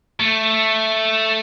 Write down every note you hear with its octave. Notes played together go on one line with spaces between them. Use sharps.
A3